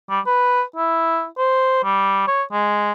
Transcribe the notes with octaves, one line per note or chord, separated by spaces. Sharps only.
G3
B4
E4
C5
G3
C#5
G#3